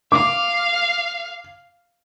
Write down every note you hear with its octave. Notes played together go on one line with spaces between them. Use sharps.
F5 D6